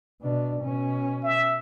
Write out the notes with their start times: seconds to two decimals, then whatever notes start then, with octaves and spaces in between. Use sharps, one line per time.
0.22 B2 D4
0.62 B2 C#4
1.23 E5